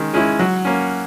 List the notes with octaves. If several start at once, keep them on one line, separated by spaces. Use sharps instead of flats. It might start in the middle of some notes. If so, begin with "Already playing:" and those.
Already playing: D#3 G#3 C#4
G#3 C#4 E4
F#3
A#3 C#4